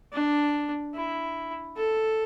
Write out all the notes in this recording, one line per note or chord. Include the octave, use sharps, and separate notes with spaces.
D4
E4
A4